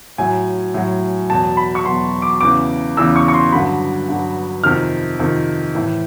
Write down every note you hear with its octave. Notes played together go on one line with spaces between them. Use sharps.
A2 F#3 G#5
A2 F#3
E2 B2 F#3 A5
B5
C#6
E2 B2 F#3 C6
D6
E2 C#3 E3 D6
E2 C#3 E3 E6
C#6
C#6
C6
G2 D3 F#3 B5
G2 D3 F#3
F2 C3 D#3 F6
F2 C3 D#3
A2 E3